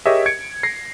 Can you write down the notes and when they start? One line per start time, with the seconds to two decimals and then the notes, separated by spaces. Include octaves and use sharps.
0.06 G4 G#4 A#4 C#5 D#5 E5
0.26 G#6 C#7 D7
0.63 A#6 C7